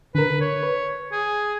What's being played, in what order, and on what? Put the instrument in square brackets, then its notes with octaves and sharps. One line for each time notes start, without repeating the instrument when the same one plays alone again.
[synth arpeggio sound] D3 A#4 [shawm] B4
[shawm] C#5
[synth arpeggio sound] B4
[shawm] G#4